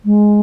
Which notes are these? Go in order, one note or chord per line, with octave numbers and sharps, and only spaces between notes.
G#3